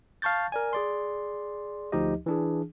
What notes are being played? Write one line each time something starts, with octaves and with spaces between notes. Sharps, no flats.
F5 A5 C#6 G6 A6
A#4 D5 G#5
G#4 D5 C6
D2 F3 D#4 G4 D#5
E3 D4 G#4